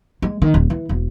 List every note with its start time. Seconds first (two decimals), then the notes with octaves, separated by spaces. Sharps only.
0.22 G#3
0.42 D#3
0.54 D#1
0.70 E3
0.89 E1